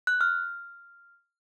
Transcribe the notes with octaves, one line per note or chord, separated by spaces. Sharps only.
F#6
F6